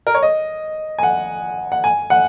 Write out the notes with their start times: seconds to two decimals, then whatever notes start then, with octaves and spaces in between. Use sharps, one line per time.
0.07 A#4
0.15 C#5
0.22 D#5
0.99 G#5
1.03 F#5
1.72 F#5
1.84 G#5
2.10 F#5